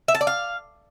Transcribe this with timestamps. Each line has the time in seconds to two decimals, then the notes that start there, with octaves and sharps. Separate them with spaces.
0.08 E5
0.15 A5
0.21 D5
0.27 F5